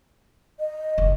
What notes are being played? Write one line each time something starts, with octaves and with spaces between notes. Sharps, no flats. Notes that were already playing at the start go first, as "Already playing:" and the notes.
D#5
F#1